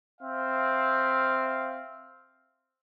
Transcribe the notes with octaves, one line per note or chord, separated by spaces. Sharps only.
C4 E5 F5